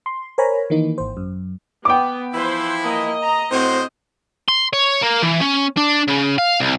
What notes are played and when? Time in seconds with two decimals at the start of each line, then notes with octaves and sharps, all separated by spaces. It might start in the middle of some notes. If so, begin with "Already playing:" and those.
0.06 C6
0.38 A#4 C5 C#5 G#5 A#5 B5
0.70 D#3 E3 A#3 D#4
0.98 G#1 C5
1.17 F#2
1.85 B3 G5 D6
2.33 E3 F3 E4 B4 C5
2.83 A#3 D#5
3.22 A#5
3.52 A2 C4 F#4 C5
4.49 C6
4.73 C#5
5.02 A#3
5.23 E3
5.41 C#4
5.78 D4
6.08 C#3
6.38 F5
6.61 C2